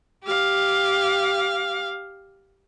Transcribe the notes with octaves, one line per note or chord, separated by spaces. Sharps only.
G4 F5